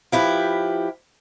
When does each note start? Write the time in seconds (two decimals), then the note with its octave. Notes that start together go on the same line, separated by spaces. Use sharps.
0.12 F3 E4 G4 B4